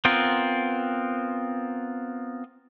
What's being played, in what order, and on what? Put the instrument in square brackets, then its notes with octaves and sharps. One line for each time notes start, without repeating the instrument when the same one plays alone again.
[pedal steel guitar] B3 C4 F4 A#4